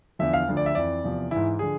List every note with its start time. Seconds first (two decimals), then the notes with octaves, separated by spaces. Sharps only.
0.19 E2 D3 F3 E5
0.34 F5
0.48 D2 D3 F3
0.57 D5
0.66 E5
0.75 F2 E3 D5
1.04 E2 C3 F3
1.31 G#2 E3 E4
1.59 D3 F3 G#4